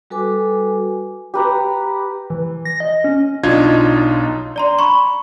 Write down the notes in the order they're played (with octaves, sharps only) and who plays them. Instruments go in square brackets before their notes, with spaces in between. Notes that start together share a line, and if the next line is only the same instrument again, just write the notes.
[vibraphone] G3 F#4 A4 B4 G#5 D6
[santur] G4 B4 A#5
[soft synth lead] E3
A#6
D#5
C#4
[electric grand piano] B1 D4 D#4 F4 G#6
[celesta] D5 A#5 C6
B5 C#6